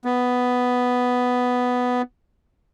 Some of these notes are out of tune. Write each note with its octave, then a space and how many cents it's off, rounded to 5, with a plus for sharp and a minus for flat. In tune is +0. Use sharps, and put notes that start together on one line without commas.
B3 +5